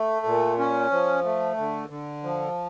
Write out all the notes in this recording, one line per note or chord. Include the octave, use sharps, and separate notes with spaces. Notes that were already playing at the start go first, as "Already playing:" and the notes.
Already playing: A3
A#2
C#4
F3
A3
D3
D3
F3